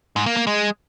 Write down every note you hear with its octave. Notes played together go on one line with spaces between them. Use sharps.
G#2
A#3
A#3
G#3